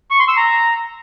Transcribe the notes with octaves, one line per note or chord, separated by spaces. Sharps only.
C#6
C6
E6
A#5